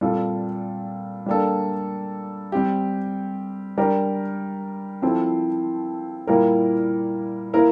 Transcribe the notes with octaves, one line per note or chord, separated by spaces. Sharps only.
A#2 G3 C4 F4 A4
G3 A#3 D4 A4
G3 C4 G4
G3 D4 G4 A#4
F3 C4 E4 A4 C5
A#2 G3 A#3 E4 A#4
E3 A#3 E4 A#4